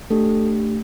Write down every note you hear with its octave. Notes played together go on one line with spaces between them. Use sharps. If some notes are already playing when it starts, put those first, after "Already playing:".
A3 D4 G4 A4